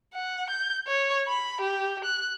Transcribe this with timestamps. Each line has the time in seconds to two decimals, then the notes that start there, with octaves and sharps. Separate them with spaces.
0.14 F#5
0.50 G6
0.87 C#5
1.27 B5
1.61 G4
2.05 F#6